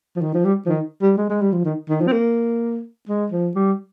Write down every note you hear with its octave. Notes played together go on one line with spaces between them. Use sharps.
F3
D#3
F3
G3
F3
D#3
G3
G#3
G#3
G3
F3
D#3
D#3
F3
C4
A#3
G#3
F3
G3